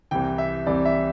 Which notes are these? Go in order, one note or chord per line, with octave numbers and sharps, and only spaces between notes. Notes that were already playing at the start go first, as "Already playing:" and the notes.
C2 C3 E3 G5
E5
C2 C3 E3 D5
E5